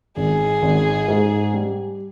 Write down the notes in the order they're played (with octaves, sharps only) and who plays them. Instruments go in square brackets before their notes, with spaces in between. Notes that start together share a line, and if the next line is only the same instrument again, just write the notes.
[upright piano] G#1 [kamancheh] G#4
[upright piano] G#1
G#2
G3